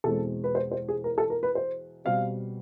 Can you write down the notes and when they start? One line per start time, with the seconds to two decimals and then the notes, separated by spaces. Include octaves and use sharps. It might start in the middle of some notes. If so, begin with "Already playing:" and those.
0.04 E2 B2 G#3 C4 A4
0.44 B4
0.55 C5
0.72 C5
0.89 G#4
1.04 A#4
1.18 A4
1.30 A#4
1.43 B4
1.55 C5
2.05 B2 G3 C4 F5